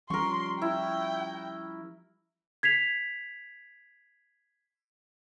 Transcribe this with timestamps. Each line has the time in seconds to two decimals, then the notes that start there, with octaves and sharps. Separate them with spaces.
0.10 F3 G3 C#4 A#4 C6 C#6
0.61 E4 G5
2.63 G#6 B6 C7 F7